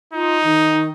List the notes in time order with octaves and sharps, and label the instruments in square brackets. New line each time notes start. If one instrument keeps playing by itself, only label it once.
[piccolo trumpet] D#4 [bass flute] F4
[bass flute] D#3